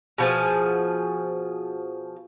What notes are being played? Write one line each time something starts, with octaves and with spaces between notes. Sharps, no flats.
B2 F3 G#4